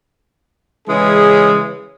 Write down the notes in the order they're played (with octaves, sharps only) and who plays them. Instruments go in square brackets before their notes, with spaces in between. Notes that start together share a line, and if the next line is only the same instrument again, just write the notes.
[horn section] C#3 E3 G#3 C#4 G#4